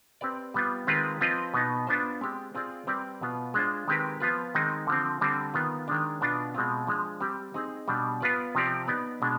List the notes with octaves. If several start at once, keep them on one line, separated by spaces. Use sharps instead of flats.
C4 G4 B4 D5
G3 B3 F4
D#3 G#3 C4 F4 B4
F3 C4 F4 B4 D#5
B2 B3 D#4
B3 D4 F4 C5
G#3 C4 G4
C4 F4 G#4 D5
G3 C4 G4 B4 D5
B2 B3 F4
G#3 D4 F4 C5
D#3 G#3 C4 G4 B4
F3 B3 F4 B4
D#3 G#3 C4 D#4
D3 F3 C4
D3 G3 C4
D#3 B3 F4
D#3 G#3 D4
B2 B3 D4 F4
B2 G#3 C4 F4
F3 G#3 D4
G3 C4 G4
C4 D#4 G#4
B2 G3 D4
B3 F4 B4 D5
C3 F3 C4 G4 D5
B3 D#4 B4 D5
B2 G#3 D4